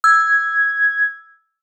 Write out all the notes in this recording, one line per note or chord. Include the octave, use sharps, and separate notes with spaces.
E6 G#6